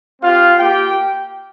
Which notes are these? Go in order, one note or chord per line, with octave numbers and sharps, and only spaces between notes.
C4 F4 G4 F5
A#3 F4 G4 G5